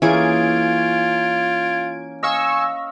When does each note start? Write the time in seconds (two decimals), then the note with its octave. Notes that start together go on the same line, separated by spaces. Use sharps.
0.02 E3 A#3 C#4 F4 G#4 G#6 D7
2.23 D#5 F5 G#5 C#6 E6